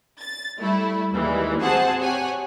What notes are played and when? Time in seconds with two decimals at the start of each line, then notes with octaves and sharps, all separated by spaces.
0.19 A6
0.59 G3 A3 E4
1.14 D#2 E3 G3 G#3
1.61 C4 F#4 G#4 C5 F#5 A5
1.99 G4 C#5 F#5 G#5 F#6